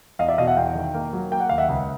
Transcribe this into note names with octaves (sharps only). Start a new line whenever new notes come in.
E2 D#5 F5
D5 E5
B2 D#5 F5
E5 F#5
E2 F5 G5
D#3
A#3
F#3
A#3 G5
F#5
D#2 F5
E5 F#5
C#2